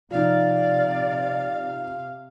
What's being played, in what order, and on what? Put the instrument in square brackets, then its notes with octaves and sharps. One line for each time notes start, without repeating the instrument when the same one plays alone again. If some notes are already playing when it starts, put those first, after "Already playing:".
[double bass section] C3 [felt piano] F3 D#4 [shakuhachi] D5 [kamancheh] F5